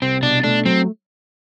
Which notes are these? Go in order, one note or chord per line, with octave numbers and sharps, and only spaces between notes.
C2 C4
B2 D4
A3 D4
F#3 C4